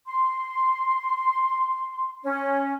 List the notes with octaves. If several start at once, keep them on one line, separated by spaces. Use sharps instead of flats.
C6
C#4